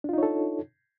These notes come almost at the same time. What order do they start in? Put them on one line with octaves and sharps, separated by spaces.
D4 F4 D#4 C#5 A4